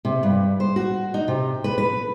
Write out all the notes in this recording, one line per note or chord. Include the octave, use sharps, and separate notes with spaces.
C3
G2
C5
F#4
D#4
C3
B4
B4